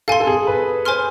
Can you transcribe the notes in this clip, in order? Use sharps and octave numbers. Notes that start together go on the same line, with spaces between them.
A4 F5 G#5 C6
A4
G#4
B4
C5 G#5 C6 F6